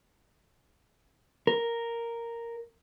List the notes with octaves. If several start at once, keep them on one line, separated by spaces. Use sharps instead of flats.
A#4